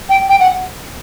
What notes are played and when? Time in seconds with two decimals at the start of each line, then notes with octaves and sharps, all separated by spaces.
0.09 G5
0.29 G5
0.39 F#5